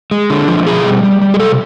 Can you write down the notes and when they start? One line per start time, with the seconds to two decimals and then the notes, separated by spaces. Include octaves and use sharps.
0.11 G#3
0.30 D3
0.48 F3
0.67 B2 G#4
0.84 G3
1.03 G3
1.21 G3
1.34 G#4
1.40 C3 A4